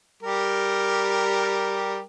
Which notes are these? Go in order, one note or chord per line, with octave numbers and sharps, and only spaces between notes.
G3 G4 A#4